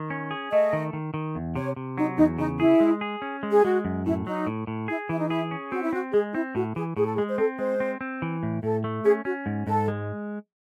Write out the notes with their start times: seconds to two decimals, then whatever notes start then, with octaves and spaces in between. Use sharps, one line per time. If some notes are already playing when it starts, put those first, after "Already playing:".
Already playing: D#3
0.10 C#4
0.31 G#4
0.52 A3 D#5
0.73 D#3
0.93 D#3
1.14 D#3
1.35 E2
1.55 C3 C#5
1.76 C3
1.98 F#3 D#4
2.18 E2 D#4
2.38 C#3 D#4
2.59 E4 G#4
2.80 G#3
3.01 G#4
3.22 C#4
3.43 G#3
3.52 G#4
3.64 G#3 F#4
3.85 F#2
4.06 A2 E4
4.27 F#3 D#4
4.47 A2
4.67 A2
4.88 E4 G#4
5.09 E3 E4
5.19 D#4
5.28 E4 G#4
5.51 C#4
5.72 C4 F#4
5.82 E4
5.93 C4 F#4
6.13 G#3 G#4
6.34 C4 E4
6.55 A2 F#4
6.76 E3 G#4
6.97 A2 G#4
7.06 A4
7.15 G#4
7.18 G#3
7.29 C5
7.38 C4 A4
7.59 G#3 C5
7.80 C4
8.01 C4
8.22 E3
8.43 A2
8.63 A2 A4
8.84 A3
9.04 C#4 G#4
9.25 C#4 F#4
9.46 G#2
9.67 G#2 A4
9.88 G#3